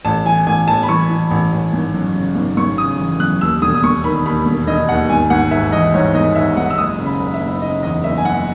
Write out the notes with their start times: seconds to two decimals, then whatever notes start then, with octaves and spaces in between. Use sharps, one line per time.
0.05 A1 A5
0.26 E3 G#5
0.47 A1 G#5
0.68 A1 A5
0.83 B5
0.89 E3 C#6
1.10 E3
1.31 A1
1.52 A1
1.73 G#1
1.94 F#2
2.15 C#3
2.36 G#1
2.57 G#1 C#6
2.78 C#3 D#6
2.99 E3
3.20 F#2 F#6
3.41 D#2 E6
3.62 E1 D#6
3.75 D#6
3.84 E1 C#6
4.04 D#3 B5
4.25 D#2 B5
4.46 E1
4.67 E1 D#5
4.88 D#2 F#5
5.09 G#1 G#5
5.30 G#1 F#5
5.51 G#2 E5
5.72 E3 D#5
5.93 G#2 C#5
6.15 G#1 D#5
6.35 G#2 E5
6.57 G#1 F#5
6.71 E6
6.78 F#1 D#6
6.98 C#3
7.06 B5
7.20 F#1
7.34 E5
7.41 F#1
7.62 C#3 D#5
7.83 E2 D#5
8.04 F#1 E5
8.18 G#5
8.24 F#1 F#5